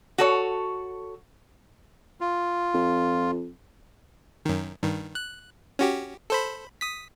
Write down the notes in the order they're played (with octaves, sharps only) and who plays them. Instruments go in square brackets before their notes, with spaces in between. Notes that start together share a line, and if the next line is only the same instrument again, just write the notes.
[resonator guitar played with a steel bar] F#4 A4 C#5
[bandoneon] F4
[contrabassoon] F2
[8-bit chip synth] F#2 D#3
G2 D#3
F#6
C#4 F#4 G4
A4 C5 B5
D#6 B6